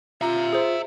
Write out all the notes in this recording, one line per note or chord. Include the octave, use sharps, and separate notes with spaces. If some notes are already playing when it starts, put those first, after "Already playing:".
F4 E5 A#5
G#4 C5